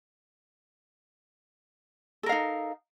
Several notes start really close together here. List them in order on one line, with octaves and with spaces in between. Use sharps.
A4 A#4 F5 D#4